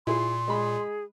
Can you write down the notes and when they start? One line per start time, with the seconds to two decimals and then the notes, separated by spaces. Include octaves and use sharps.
0.07 A#2 E4 F4 G#4 C6
0.48 G#3 G#4 B5